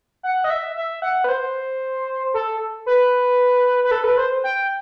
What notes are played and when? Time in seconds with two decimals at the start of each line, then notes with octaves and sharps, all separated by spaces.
0.23 F#5
0.44 D#5
0.50 E5
0.76 E5
1.02 F#5
1.24 B4
1.29 C5
2.34 A4
2.86 B4
3.84 B4
3.91 A4
4.04 B4
4.17 C5
4.44 G5